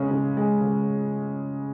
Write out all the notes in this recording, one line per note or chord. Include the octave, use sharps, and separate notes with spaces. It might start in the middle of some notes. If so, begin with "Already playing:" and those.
Already playing: C#3 G#3 C#4
C#3
G#3
C#3